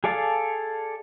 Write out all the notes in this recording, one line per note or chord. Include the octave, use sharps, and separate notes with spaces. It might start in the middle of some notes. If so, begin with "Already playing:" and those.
G#4 A4 D5 F5 A5